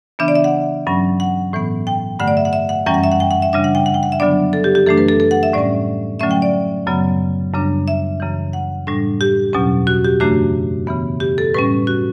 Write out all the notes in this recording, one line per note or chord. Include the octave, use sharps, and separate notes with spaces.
C#3 E3 B3 D4 E5
D5
E5
F#5
G2 F#3 C#4
F#5
A2 E3 B3
G5
G2 D3 A3 F#5
D5
E5
F#5
E5
F#5
F#2 E3 G3 C#4 G5
F#5
E5
F#5
G5
F#5
E5
C#3 G3 D4 E5
F#5
G5
F#5
G5
F#5
E5
D3 F#3 B3 D4 D5
A4
G4
G4
F#2 E3 A3 D4 A4
B4
A4
A4
F#5
E5
A2 G3 C#4 D5
D3 F#3 A3 C#4 E5
G5
D5
F#2 C#3 F#3 B3
F#2 C#3 G3 D4
E5
F#2 C#3 E3
F#5
A2 G3 D4
G4
E2 B2 F#3 C#4
F#4
G4
F#2 C#3 E3 A3 D4 F#4
C#3 E3 B3
G4
A4
A2 G3 C#4 B4
F#4